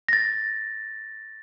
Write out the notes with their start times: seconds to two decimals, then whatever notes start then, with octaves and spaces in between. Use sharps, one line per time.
0.09 A6 A#6